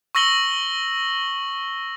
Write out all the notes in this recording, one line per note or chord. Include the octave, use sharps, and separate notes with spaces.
C#6 E6 A#6 F#7 G7